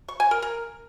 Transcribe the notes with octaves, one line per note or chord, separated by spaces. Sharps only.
C#6
G#5
A#4
A#4